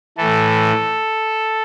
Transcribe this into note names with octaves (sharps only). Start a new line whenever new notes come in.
A2 E3 A4